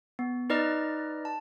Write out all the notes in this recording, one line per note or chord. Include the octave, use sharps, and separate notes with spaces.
B3
D#4 B4 D5 D#5 F6 A6
A5